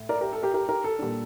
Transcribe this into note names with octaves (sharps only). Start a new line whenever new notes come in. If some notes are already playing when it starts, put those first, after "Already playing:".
Already playing: A2
A#4 D5
G4 A#4
A4
G4 A#4
G4 A#4
G4 A#4
A4
A#2 G3 D4